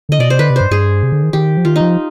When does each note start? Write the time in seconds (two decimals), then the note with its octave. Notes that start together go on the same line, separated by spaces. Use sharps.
0.09 D3 D#5
0.19 B2 D5
0.29 C3 C5
0.39 D3 B4
0.50 C3
0.56 G2 C5
0.71 G2 G#4
1.03 C3
1.12 D3
1.23 D#3
1.33 D#3 G4
1.57 F3
1.65 D#3 F4
1.76 F3 D#4